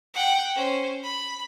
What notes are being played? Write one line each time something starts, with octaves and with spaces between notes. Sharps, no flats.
F#5 G5
C#4 C5
B5